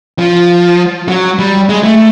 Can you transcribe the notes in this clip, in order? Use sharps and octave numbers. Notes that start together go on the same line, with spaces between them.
F3
F#3
G3
G#3
A3